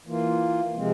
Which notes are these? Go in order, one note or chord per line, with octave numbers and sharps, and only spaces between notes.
E3 A#3 F4
C3 F3 G#3 C4